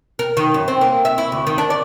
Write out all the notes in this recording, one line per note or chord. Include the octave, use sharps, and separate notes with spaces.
A#4
D#3
F#2
C4
A#3
E5
E4
D2
D#3
D4
D5